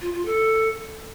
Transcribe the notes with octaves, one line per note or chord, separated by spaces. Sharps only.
F4
F4
A4